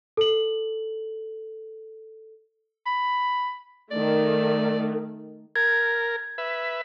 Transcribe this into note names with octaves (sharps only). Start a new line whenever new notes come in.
A4 F#7
B5
D#3 A3 D5
A#4 G#6
B4 E5